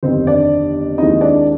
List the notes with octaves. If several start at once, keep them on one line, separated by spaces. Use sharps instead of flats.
G1 F2 C3 D#3 C4 C5
D4 D5
D#2 D#3 G#3 C4 D#4 E4 D#5
D4 D5